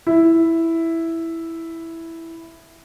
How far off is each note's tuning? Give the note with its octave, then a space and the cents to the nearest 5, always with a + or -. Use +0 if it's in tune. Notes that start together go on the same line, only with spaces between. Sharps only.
E4 +0